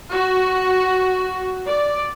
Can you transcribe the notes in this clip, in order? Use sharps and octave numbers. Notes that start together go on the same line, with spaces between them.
F#4
D5